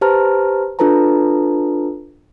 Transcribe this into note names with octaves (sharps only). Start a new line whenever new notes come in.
G4 B4 C5 A5 A#5 F6
D4 F4 A4 B4 A5 A#5